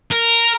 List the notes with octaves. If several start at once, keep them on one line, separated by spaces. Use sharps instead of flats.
A#4